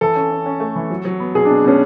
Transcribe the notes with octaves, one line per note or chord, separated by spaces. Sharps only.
E3 A4
C#4
C#4
C#4
A3
E3
F#3
F#3
B3
B2 G#4
B2 D4
B2 C#4